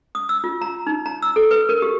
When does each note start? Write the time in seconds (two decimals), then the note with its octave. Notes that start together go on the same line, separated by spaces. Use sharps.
0.15 D#6
0.29 E6
0.44 F4
0.62 A#5
0.87 D#4
1.06 A#5
1.22 E6
1.36 A4
1.51 B4
1.69 A#4
1.82 G4